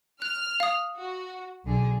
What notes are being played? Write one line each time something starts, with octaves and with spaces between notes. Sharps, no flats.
F6 F#6
F5 D#6
F#4
B1 D3 G#4